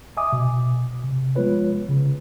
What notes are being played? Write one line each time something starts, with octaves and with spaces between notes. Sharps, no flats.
D#5 E5 G#5 D6 D#6
B2
C3
F3 G#3 B3 F4 B4 C#5
C#3